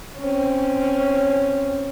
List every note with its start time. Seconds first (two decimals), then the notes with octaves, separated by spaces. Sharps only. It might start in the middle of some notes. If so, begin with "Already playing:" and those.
0.18 C4 C#4